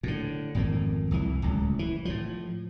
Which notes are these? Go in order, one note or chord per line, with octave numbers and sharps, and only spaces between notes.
A2 D3
G#1 F2 A2 A#3
C2 F2 E3
D1 C#2
E3
A2 F3